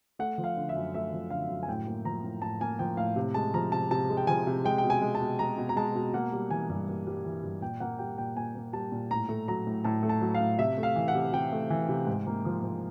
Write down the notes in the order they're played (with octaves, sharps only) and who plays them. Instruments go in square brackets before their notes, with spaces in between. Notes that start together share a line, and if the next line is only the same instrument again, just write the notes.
[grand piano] A3 F#5
F3
F5
D3
E5
F#2
A3 E5
F3
D3 F5
F#2
G#5
A2 G5
A#3
F3 A#5
A2
A2 A5
A#3 G#5
F3 G5
A2 F5
C3
G#3 A5
F3 A#5
C3 A5
C3 A5
G#3
G5
F3 G#5
C3
G#3 G5
B2 G5
G#5
G#3
A5
B2
G#3 A#5
B2
A#5
G#3 A5
B2
A#3 F#5
G3
E3 G#5
G2
A#3
G3
E3
G2
A#2 G5
A#3 F#5
G3 G5
A#2 G5
A#2 G#5
A#3
G3 A5
A#2
A2 A#5
A3
F#3 A#5
A2
A2 A5
A3
A5
F#3
F5
A2
C3 E5
A3
F5
E3
F#5
C3
C3 G5
A3
E3
C3
G#2
A#3
F3
G#2